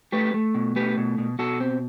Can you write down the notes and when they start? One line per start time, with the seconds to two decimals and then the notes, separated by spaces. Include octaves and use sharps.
0.12 A3 G4 B4
0.34 A3
0.55 B2
0.76 A3 G4 B4
0.97 B2
1.18 B2
1.39 B2 F#4 A4
1.60 C4